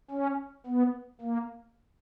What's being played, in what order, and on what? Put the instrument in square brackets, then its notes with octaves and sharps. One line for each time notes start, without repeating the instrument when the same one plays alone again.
[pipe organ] C#4
B3
A#3